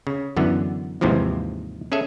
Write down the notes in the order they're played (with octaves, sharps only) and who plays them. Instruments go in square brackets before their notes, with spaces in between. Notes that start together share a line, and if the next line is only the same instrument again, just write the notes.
[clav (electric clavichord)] C#3
F#2 D3 E3 B3
D#2 G#2 C3 E3 F3
C#4 G#4 A4 E5